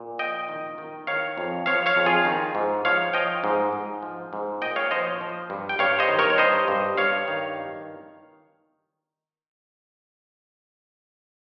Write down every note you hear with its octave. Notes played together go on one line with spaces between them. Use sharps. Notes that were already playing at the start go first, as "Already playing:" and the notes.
Already playing: A#2
F3 D#5 G5
D#3
D#3
D#3 C#5 F5
F2
F3 C#5 F5
C#5 F5
F2
F4 G#4
D#3
G#2
F3 C#5 F5
F3 D#5 G5
G#2
G#2
F3
G#2
A#2 D#5 G5
C#5 F5
F3 C5 D#5
F3
G2
G5
G2 C#5 F5
C5 D#5
D#3
A#4 C#5
C#5
G2 C5 D#5
G2
G2 C#5 F5
D#3